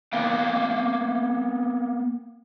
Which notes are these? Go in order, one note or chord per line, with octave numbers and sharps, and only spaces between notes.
A#3 B3 F5 G5